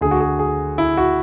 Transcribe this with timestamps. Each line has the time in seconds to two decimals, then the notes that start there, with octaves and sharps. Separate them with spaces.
0.01 D2 D3 G#4
0.11 F#4
0.20 G#4
0.39 G#4
0.78 E4
0.97 F#4